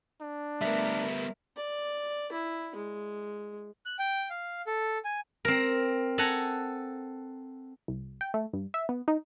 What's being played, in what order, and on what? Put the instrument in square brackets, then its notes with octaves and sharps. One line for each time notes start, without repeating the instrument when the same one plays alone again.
[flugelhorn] D4
[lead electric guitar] G3 B3 [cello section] A3 A#4 [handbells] E5
[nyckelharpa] D5
E4
G#3
[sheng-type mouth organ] F#6
G5
F5
A4
G#5
[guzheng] C4 A#4
A4 F#5 G#5 A#5
[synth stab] C2
G5
A3
G2
E5
B3
D#4